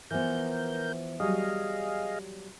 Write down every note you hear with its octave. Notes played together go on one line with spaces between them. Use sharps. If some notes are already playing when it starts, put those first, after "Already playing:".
E3 F3 B3 A#4 G6
F#3 G3 G#4 D#5 F5